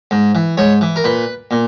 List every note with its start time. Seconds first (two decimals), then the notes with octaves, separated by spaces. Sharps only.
0.11 G#2
0.35 E3
0.57 G#2 C#5
0.81 E3
0.96 A#4
1.04 A#2 B4
1.51 A#2